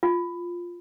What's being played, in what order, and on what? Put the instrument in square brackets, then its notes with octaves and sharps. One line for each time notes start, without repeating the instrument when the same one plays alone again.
[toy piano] F4